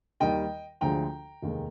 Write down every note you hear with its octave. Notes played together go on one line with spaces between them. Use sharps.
D#2 D#3 G3 D#5 G5
D2 D3 F3 G#3 G5 A#5
F1 D#2 D#3 G#3